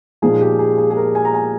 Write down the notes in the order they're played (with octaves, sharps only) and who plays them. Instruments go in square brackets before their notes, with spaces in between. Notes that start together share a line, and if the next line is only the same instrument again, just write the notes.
[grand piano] A#2 F3 G#3 D#4 G#4
G4
G#4
G#4
G#4
A#4
G#5
A#5
G#5